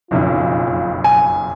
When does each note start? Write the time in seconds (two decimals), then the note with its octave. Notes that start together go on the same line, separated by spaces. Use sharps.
0.11 F#1 B1 F2 F4
1.04 G#5